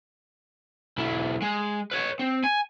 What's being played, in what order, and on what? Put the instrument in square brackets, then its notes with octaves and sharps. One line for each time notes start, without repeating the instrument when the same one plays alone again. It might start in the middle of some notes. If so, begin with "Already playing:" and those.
[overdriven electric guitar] B1 E4
G#3
B4 C#5
C4
G#5